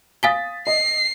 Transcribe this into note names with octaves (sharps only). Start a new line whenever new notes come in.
F5 G#5 D#6 A6 B6 G7
D#5 C7